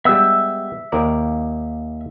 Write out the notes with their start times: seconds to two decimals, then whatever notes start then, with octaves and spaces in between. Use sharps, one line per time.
0.05 G3 G#3 B3 E5 E6
0.92 D#2 A#4 D5